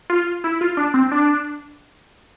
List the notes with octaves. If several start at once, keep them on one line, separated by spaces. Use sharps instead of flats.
F4
E4
F4
D4
C4
D4